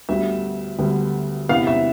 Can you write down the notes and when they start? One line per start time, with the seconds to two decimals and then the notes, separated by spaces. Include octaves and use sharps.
0.09 D2 D3 G3 B3 E5
0.78 D2 D3 G3 B3
1.49 E2 C3 E3 B3 F5
1.67 E5